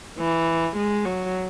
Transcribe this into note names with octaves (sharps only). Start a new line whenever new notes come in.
E3
G#3
F#3